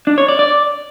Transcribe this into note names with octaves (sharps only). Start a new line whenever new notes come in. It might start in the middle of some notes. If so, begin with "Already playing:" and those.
D4
C#5
D5
D5